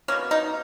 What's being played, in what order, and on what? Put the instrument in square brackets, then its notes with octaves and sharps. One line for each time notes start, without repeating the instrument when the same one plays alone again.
[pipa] B2 A#3 C#4
D#4